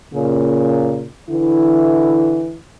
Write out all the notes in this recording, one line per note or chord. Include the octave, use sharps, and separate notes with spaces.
A#2 C#3
D3 E3 E4